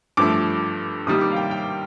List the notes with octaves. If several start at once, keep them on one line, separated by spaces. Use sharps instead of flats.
G2 F3 A3 D6
C3 D#3 G3 A#3 D#6
D6
F5
G5
G5